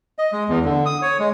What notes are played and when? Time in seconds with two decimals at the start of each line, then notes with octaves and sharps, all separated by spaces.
0.18 D#5
0.32 G#3
0.49 E2
0.65 D3
0.86 D#6
1.02 C#5
1.19 G#3